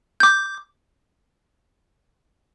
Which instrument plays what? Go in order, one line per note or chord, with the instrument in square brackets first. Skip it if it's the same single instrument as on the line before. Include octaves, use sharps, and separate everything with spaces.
[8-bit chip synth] D6 G6